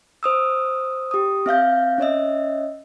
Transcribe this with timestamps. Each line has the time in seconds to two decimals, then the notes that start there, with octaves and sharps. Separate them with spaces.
0.23 C5 D#6 E6
1.11 G4 D#6
1.46 C4 E5 F5 G6
1.98 C#4 C#5 D#5 E5